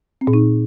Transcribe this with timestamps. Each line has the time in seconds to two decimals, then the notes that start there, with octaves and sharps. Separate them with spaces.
0.21 C4
0.27 A#2
0.33 D#4